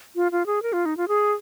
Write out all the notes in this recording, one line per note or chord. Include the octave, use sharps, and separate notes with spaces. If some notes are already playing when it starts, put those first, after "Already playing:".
F4
F4
G#4
A#4
F4
D#4
F4
G#4